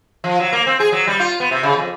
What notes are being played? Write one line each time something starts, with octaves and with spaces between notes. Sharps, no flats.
F3
F#3
A#3
C4
G#4
F#3
G3
F4
B3
C3
C#3
F2